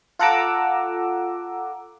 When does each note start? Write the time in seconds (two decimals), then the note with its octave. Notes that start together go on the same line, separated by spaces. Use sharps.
0.19 F4 A4 F#5 A#5 D6 E6